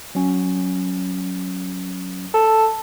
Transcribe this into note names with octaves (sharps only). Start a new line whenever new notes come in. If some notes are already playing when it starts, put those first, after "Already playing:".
F#3 C#4
A4